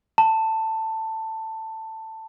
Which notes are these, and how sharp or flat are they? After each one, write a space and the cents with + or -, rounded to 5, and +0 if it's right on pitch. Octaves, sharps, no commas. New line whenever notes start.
A5 +15